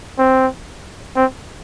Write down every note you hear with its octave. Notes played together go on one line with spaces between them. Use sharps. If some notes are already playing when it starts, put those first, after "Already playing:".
C4
C4